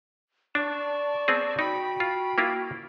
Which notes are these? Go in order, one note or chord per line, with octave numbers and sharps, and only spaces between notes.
D4 D5 A5 C#6
B3 C4 G#4
D#4 F#4 G5 B5
F4
A#3 E4 F4